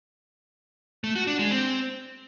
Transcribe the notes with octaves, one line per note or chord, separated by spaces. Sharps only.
A3
F#4
D4
G#3
C4